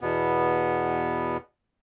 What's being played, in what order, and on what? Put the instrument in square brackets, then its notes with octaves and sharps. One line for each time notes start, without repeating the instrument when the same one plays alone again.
[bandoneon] E2 B2 B3